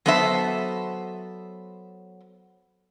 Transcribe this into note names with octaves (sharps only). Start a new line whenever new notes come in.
F#3 B3 A4 C5 E5